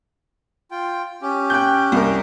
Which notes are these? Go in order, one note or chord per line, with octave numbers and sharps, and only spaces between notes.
F4 G5
C#4 G4
G5 F#6 G6
C2 A#4